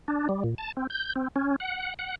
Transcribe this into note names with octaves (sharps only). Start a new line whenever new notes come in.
D4
G3
A#2
A5
C4
G6
C4
C#4
F#5
F#5